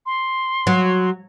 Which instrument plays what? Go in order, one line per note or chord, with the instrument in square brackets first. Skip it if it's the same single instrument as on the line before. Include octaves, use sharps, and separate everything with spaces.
[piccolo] C6
[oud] F#3